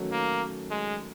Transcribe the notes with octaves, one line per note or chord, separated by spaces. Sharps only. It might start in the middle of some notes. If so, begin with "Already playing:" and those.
Already playing: D#3 F#3 A3 C#4 F#4
A#3
G#3